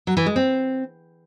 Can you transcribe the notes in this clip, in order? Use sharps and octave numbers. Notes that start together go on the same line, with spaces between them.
F#3
E3
G#3
C4